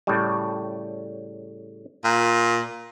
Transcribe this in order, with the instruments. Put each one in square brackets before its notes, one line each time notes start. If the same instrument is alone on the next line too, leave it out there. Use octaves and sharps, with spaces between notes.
[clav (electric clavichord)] A2 C#3 G3
[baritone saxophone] A#2